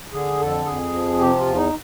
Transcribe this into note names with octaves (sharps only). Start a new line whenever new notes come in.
D3 G#4
F2 A4
F2 G#4
F3
C3 G4
F4
E2
D#4